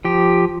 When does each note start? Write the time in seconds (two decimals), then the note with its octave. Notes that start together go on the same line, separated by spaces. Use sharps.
0.05 F3 G4